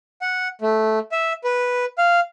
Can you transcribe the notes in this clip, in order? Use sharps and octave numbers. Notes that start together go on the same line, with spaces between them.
F#5
A3
E5
B4
F5